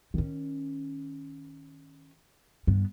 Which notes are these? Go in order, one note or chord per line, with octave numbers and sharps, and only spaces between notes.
D#3 C#4
G2 B3